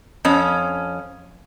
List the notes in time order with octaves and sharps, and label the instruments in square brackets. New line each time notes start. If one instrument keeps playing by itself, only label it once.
[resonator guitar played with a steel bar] F2 C#4